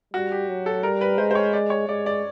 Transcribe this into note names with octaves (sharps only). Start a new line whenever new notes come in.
G3 F#4
G4
F#3
A4
G3 A#4
B4
G#3 C5
C5
C#5
D5
C#5
G#3 D5
D5